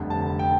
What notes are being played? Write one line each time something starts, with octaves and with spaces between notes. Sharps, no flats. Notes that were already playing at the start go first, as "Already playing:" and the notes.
Already playing: F1 F2 D3 G3
A5
G5